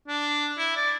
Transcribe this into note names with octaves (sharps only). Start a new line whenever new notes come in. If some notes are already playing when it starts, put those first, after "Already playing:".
D4
E4
D5